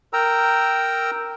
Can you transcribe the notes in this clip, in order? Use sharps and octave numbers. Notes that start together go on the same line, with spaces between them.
A#4 G5 A#5 E6